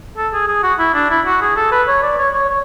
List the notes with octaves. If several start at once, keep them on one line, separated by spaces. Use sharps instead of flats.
A4
G#4
G#4
F#4
E4
D4
E4
F#4
G#4
A4
B4
C#5
D5
C#5
C#5
C#5